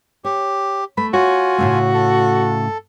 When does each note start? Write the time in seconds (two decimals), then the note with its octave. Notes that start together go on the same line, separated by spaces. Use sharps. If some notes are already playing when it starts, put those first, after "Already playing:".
0.24 G4 C#5
0.97 A3 B5
1.13 F4 F#4 C#5 G#5
1.58 A2 C#3 A3
1.94 A4